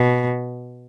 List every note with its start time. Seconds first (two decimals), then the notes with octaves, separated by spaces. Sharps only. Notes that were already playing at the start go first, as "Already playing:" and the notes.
Already playing: B2